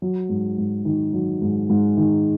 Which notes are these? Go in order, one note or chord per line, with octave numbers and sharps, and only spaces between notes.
F#3
G#2
G#2
D#3
F#3
G#2
G#2
D#3